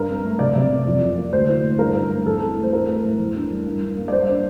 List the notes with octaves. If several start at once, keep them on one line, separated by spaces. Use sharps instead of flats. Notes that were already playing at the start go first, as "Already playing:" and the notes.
Already playing: G2 A#4
C4
A3
C3 D5
C3
C4
F2
F2
A#3
D2 C5
E4
A3
G2 A#4
G2
A3
E2 A4
C4
A3
C5
A2 A#4
A2
A3
E2
D4
G3
G2
G2
A#3
D5
G2 C5
D4